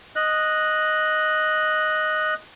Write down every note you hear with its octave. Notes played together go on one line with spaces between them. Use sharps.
D#5 F#6